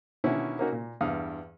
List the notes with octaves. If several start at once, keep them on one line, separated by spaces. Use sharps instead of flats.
B2 D3 D#3 C#4 E4
A#3 C#4 D#4 F#4 A#4
A#2
E2 G2 F5 D#6